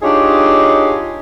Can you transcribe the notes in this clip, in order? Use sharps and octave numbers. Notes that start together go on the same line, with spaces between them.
D4 D#4 F4 G4 G#4 C#5